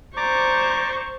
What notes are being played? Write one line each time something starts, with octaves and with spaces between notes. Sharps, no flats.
C5 D5 A#5 C#6 D6